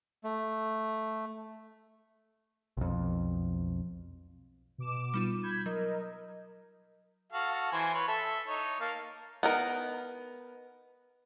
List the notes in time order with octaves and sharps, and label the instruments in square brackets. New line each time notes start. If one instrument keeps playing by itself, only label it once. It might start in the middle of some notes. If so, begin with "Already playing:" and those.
[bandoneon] A3
[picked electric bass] B1 F2
[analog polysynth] B2 D6 E7
[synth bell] G3 D#4 F4
[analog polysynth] B5 G6 G#6
[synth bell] F#3 [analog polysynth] A#4 D#5
[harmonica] F#4 A4 F5
E3 C5 G#5
B4 C#5
A4 E5
D#4 C#5
A#3 F5 A5
[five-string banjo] B3 D#4 A#4